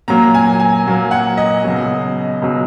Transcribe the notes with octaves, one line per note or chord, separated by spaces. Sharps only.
A#2 F#3 A#3 A#5
G#5
G#5
A#2 F#3 A#3
F#5
D#5
C#2 B2 F#3
C#2 B2 F#3